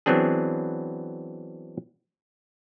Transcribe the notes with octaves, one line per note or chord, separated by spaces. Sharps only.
E3 F#3 B3 C4 D4 G#4